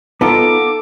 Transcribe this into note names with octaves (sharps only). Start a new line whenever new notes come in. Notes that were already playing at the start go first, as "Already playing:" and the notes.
B3 D#4 F4 A4 D6